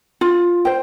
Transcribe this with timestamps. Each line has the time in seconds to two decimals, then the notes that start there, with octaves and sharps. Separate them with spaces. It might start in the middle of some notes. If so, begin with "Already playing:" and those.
0.21 F4
0.65 C5 G5